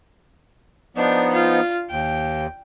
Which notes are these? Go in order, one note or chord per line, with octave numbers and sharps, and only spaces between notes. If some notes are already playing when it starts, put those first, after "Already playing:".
F3 B3 D4 D#4
F4
D#2 G5